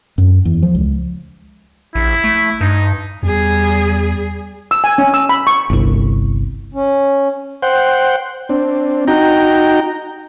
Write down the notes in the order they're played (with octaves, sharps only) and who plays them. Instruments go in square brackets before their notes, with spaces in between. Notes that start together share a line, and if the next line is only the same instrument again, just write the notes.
[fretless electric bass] F#2
E2
F3
C#2
[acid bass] A#1 [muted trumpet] E4
[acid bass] A3
[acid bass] G2 [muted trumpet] D#4
[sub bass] E2 [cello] G3 G#4
[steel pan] E6
G#5
C#4
E6
B5
C#6
[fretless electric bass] G1 C2
[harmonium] C#4
[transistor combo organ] C5 F#5 G5
C4 D4
D#4 F#4 G5 A#5